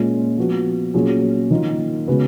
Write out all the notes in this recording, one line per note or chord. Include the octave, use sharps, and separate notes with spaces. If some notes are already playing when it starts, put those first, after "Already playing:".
Already playing: A#2 G#3 C#4 F4
F3 B3 F#4
A#2 F#3 C#4 F4 G#4
D#3 A#3 F4
C#3 G#3 B3 F#4